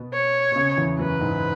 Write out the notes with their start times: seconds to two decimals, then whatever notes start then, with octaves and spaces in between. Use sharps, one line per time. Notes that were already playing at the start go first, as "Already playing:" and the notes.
Already playing: B2 B3
0.13 C#5
0.52 B2
0.56 C#3
0.77 E2 E3
0.99 F#2 F#3 B4
1.21 G#2 G#3